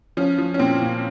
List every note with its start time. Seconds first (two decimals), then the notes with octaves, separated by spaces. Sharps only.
0.17 F3 C#4
0.38 F3
0.54 C#4
0.59 A#2 C4
0.82 A#2